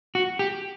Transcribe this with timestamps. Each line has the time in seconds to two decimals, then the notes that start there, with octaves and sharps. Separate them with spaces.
0.15 F#4
0.39 G4